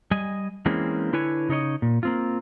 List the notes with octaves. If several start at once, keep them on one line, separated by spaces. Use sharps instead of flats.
G3 D#5 G#5
E3 G#3 A#3 C4 C#4
D3 E4 B4 C#5 G#5
C#3 D#4 A4 C#5 D#5
A#2
A#3 C4 F4